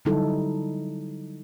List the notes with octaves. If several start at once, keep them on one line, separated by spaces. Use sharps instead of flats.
D3 F#3 G3 D#4 E4 A4